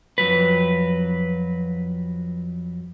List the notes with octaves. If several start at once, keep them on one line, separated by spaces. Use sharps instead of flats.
F2 F#3 B4